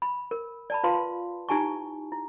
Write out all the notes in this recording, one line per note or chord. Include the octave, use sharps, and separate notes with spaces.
B5
A#4
D5 A5 B5
F4 B4 F5 A5 C6
D#4 E4 G4 G#5 A5 C#6
E4